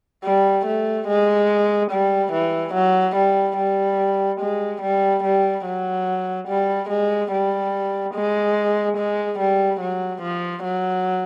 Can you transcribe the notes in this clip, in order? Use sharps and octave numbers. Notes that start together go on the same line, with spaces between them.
G3
A3
G#3
G3
E3
F#3
G3
G3
G#3
G3
G3
F#3
G3
G#3
G3
G#3
G#3
G3
F#3
F3
F#3